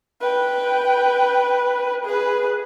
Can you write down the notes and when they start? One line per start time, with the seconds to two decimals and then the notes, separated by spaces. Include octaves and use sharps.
0.21 B4 G5
2.05 G#4 B4